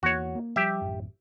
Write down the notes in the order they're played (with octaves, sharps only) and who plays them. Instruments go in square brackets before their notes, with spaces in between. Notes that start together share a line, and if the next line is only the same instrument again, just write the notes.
[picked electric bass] E2 E3 A#3 [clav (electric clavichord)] F#4 C#5
[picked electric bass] A#3
[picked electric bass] F3 G3 [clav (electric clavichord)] G4 E5
[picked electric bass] A1 F#2